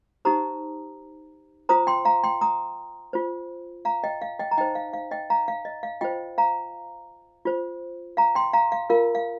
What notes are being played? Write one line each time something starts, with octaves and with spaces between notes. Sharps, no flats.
D#4 G4 C5 A#5 D#6
F4 C5 A#5 D#6
G5 C6
F5 A#5
G5 C6
A#5 D#6
F4 C5
F5 A#5
D#5 G5
F5
D#5 G5
A#5
D#4 C5 D#5 G5
F5
F5
D#5 G5
F5 A#5
F5
D#5
F5
F4 C5 D#5 G5
F5 A#5
F4 C5
F5 A#5
G5 C6
F5 A#5
F5
F4 A#4 F5
F5